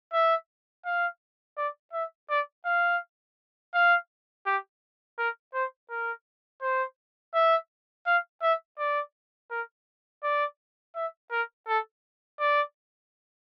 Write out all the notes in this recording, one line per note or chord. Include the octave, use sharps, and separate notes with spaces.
E5
F5
D5
E5
D5
F5
F5
G4
A#4
C5
A#4
C5
E5
F5
E5
D5
A#4
D5
E5
A#4
A4
D5